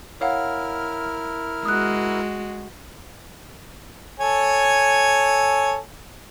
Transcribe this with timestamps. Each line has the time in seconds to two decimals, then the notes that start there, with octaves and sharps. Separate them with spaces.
0.21 E4 A#4 C#5 F5 F#5 F6
1.65 G#3 F#4 D#6 F#6
4.20 A4 C#5 G#5